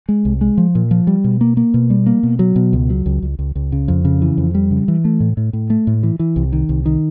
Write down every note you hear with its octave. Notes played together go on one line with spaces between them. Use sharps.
G#3
C2
G#3
F3
A#2
F3
G3
B2
A#3
A#3
B2
G3
A#3
B2
F#3
B2
C#2
F#3
C#2
C#2
C#2
C#2
C#3
F2
C#3
E3
F2
G3
C#3
E3
A3
A2
A2
A2
A3
A2
E3
E3
C2
D#3
C2
D#3